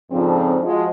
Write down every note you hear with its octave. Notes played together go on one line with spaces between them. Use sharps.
F2 G#2 C#3 F3 C4 D4
F3 G#3 F#4